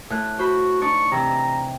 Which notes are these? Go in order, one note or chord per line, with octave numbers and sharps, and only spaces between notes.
A2 F#6
F#4 C5 B5
D4 D#4 C#6
C3 E3 A#5